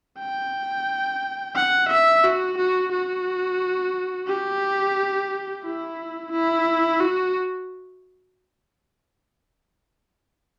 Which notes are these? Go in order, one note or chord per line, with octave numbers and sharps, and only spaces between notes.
G5
F#5
E5
F#4
F#4
F#4
G4
E4
E4
F#4